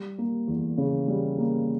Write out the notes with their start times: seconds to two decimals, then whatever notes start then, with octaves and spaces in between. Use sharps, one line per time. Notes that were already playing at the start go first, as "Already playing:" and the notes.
Already playing: G3
0.18 A#3
0.48 E2
0.77 C#3
1.08 G3
1.38 A#3